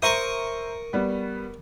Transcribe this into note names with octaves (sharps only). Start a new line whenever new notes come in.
A#4 C5 E5 A#5 C#6 D#6
G3 B3